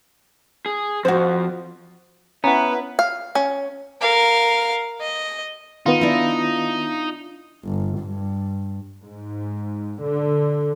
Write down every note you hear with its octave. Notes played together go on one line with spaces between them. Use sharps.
G#4
F2 F#4 C5
B3 C#4 E4 B4 F#5 A#5
F5
C#4
A#4 F5
D#5
D#3 B3 D#4 F4
D4 E4
G1
G2
G#2
D3